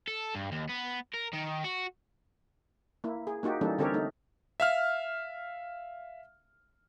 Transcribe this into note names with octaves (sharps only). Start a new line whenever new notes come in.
A4
G2
D#2
B3
A#4
D#3
F#4
A#3 E4
G#4
A#3 D#4 F#4 G4
E3 G3 A#3 C#4 D#4 A4
D3 C4 G4 A4 A#4 C#5
A3 D#4
E5 F5 F6